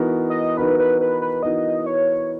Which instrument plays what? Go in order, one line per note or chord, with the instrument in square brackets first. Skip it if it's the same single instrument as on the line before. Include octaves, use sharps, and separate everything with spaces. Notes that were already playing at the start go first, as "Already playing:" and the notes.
Already playing: [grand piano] E3 B3 D#4 F#4 A#4
[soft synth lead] D#5
[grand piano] E3 B3 D#4 F#4 A#4 [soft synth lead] B4
[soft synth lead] B4
B4
B4
[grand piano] E3 B3 D#4 F#4 A#4 [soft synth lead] D#5
[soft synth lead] C#5